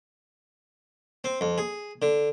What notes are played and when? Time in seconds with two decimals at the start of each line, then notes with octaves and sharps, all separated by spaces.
1.24 C4
1.41 F2
1.58 G#4
2.02 D3